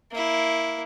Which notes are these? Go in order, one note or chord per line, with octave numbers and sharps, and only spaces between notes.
A#3 E4